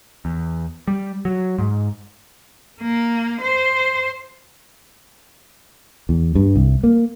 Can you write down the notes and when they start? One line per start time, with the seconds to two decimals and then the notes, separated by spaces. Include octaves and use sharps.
0.25 E2
0.88 G3
1.25 F#3
1.59 G#2
2.81 A#3
3.41 C5
6.09 E2
6.35 G2
6.55 C2
6.83 A#3